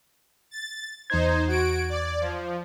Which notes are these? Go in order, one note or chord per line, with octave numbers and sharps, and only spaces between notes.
A6
E2 D#4 C5 G#6
F#4 D7
D5
F3